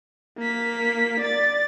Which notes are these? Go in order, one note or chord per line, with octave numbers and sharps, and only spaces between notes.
A#3 B6
D5 A6